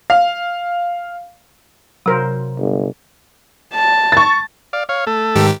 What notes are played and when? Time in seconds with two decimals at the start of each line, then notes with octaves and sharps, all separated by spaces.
0.10 F5
2.06 C3 F#3 A#4 C5
2.59 G1
3.74 A5
4.12 C#6 A6
4.73 D5 F5
4.89 C#5 F5
5.07 A3 A4
5.35 G#2 D#3 G4